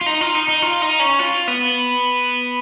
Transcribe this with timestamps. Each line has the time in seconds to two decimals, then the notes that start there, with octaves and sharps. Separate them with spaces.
0.01 F4
0.06 D#4
0.21 F4
0.35 D#4
0.48 D#4
0.62 F4
0.82 D#4
1.00 C#4
1.19 F4
1.48 B3